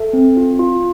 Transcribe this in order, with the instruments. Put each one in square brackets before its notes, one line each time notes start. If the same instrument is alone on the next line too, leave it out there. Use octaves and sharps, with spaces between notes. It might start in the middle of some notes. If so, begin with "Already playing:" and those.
Already playing: [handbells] A4 E5
C4
F4
F4